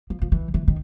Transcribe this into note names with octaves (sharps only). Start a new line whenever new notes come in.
F3
F3
E3
E3
D#3